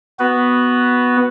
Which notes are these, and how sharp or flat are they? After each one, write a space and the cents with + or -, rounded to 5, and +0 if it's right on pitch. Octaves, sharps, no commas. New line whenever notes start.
B3 +0 F#4 +0 B4 +0